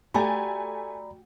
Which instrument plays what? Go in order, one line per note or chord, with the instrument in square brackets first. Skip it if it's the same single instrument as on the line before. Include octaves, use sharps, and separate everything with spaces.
[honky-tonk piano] A3 G#5 A6 [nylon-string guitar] F#4 G4 [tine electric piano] D5 A#5 B5